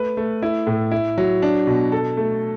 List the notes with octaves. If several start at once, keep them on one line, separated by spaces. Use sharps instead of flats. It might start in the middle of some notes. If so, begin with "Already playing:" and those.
Already playing: A3 B4
A3
E4
A2
E4
F#3
D4
B2
A4
A3